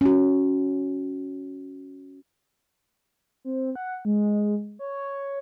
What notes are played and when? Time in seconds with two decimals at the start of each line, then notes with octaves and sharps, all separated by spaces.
0.01 C#4 F#4
3.44 C4
3.75 F#5
4.05 G#3
4.79 C#5